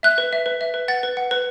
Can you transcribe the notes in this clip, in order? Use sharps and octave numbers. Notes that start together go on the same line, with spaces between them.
E5 F#6
B4
E5
B4
E5
B4
F#5 A6
B4
F#5
B4